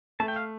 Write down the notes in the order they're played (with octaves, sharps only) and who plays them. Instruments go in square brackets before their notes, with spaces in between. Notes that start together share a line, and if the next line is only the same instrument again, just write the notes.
[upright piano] A3 [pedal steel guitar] A5
[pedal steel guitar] G5
F5